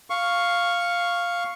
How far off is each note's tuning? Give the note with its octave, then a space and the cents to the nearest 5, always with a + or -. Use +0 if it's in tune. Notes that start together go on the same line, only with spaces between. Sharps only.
F5 +0 C#6 +0